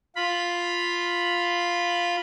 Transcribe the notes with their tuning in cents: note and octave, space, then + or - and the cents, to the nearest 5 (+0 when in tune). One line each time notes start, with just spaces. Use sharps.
F4 +0 B5 +0